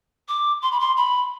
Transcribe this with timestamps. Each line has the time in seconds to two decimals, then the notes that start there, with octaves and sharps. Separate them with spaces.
0.28 D6
0.62 C6
0.71 B5
0.79 C6
0.96 B5